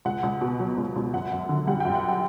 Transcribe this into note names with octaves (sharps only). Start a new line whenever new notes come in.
C#2 F#5
C#2
B2
F#3
C#2
C#2
F#2 F#5
F#2
D3
G3 F#5
G5
F#2
F#5
G5